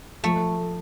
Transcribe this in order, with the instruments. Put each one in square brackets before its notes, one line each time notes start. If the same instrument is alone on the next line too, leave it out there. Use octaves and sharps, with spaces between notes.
[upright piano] F3 [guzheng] A3